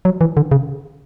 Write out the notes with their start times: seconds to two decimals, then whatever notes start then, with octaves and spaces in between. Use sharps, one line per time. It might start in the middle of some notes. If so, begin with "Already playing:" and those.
0.05 F#3
0.21 E3
0.37 D3
0.51 C#3